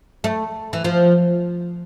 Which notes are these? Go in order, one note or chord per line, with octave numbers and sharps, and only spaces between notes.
A3
E3
F3